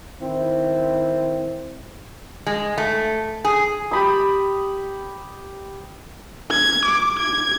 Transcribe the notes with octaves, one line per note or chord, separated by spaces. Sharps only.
D#3 C4 E4
G#3
A3
G#4
G4 B5 D#6
G#6
D6
G#6